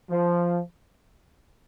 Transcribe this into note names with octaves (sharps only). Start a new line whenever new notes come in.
F3